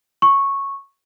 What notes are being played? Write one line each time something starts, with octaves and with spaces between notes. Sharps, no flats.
C#6